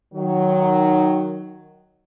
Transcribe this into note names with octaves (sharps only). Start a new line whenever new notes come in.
D#3 F#3